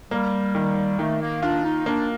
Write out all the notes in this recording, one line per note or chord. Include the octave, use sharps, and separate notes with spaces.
G3 A#3
D#3
D#3 A3
A#3
D4 F4
D#4
A#3 D4